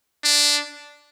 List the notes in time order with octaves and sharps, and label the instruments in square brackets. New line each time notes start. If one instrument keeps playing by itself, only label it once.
[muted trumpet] D4